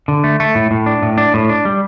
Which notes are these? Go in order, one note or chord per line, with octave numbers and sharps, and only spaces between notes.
D3
A3
A3
A2
A2
D4
A2
D4
A2
D4
G3